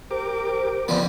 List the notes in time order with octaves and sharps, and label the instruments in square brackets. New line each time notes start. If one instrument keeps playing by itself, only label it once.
[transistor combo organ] G4 A#4 D6 [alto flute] C5
[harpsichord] F2 D3 F3 [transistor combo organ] B3 F4 B4